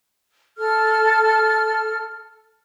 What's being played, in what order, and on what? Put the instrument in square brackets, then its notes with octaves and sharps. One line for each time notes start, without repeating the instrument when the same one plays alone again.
[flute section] A4 F6